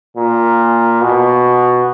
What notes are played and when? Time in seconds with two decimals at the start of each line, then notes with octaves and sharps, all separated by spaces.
0.17 A#2
1.02 B2